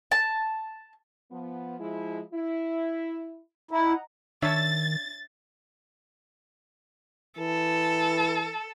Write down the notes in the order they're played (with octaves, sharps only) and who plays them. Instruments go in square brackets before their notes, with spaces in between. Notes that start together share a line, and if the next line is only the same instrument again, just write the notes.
[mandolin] A5
[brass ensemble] F3 B3
F3 G#3 E4
E4
[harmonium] E4 [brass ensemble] D#5 F#5 A#5
[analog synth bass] D#3 [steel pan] D4 C#5 E5 [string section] A6
[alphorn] E3 [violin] A4